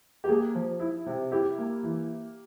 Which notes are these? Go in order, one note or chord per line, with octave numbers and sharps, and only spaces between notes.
G4
A#3 G#4
F3
E4
C3
E4 G4
A#3
E3